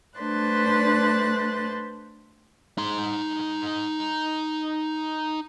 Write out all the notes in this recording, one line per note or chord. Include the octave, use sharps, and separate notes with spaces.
A3 D4 B4 C5 F#6 A6
D#4 C6